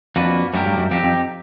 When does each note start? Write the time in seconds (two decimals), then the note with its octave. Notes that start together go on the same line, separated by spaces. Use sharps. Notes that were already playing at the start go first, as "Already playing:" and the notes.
0.16 F2 A#3 D4 F#4 B4
0.53 F#2 F#3 A3 D4 G4 A#4
0.66 G2
0.78 F#2
0.91 F2 C4 D#4 G4
1.04 F2